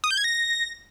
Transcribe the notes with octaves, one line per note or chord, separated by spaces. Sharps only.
D#6
G6
G#6
A#6